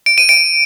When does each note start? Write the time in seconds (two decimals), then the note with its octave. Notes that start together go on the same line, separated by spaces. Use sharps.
0.06 D7
0.18 D#7
0.29 D7